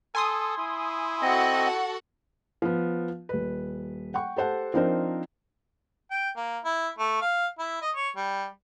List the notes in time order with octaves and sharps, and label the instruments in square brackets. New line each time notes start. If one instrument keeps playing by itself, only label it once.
[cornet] A4 [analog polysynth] G#5 C6 D#6
[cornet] E4
[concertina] C4 D#5 [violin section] F#4 A4 F#5
[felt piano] F3 B3
D#1 B4
F#5 G5 C#6
G4 A4 C5 F#5 A5
F3 C4 D4 D#4 A#4 C5
[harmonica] G5
A#3
E4
A3
F5
E4
D#5
C#5
G3